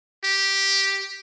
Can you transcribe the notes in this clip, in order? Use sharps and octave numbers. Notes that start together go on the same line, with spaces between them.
G4